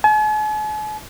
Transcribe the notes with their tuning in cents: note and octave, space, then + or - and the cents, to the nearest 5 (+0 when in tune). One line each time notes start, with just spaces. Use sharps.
G#5 +45